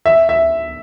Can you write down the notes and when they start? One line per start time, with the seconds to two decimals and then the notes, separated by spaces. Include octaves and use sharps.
0.06 E5
0.29 E5